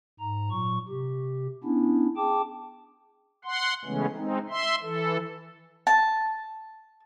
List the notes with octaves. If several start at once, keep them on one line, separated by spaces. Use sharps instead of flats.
G#2 A#5
A#2 F#3 C#6
C3 G4
B3 C#4 D4 E4
G#4 G5 A5 D6
F#5 C6
C#3 E3 G#3 A3 B3 C#4
G#3 C4 D#4
E5 C6
E3 A4
A5